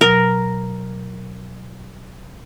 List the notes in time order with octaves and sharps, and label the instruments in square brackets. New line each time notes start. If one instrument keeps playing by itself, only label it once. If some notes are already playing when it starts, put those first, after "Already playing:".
[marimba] B2 F#3 [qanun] A#4